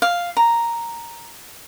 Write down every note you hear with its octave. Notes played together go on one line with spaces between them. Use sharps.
F5
A#5